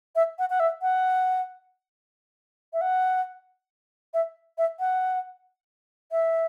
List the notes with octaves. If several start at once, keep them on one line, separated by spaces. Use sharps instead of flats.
E5
F#5
F#5
E5
F#5
E5
F#5
E5
E5
F#5
E5